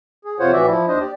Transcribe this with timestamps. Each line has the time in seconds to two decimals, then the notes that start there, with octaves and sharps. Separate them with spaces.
0.25 G#4
0.40 F2 C3 F4 C5 C#5 F#5
0.53 A2 E3 F#4 D5 E5
0.67 F3 E4
0.88 D#2 D4 C5 D#5
1.00 G4 D5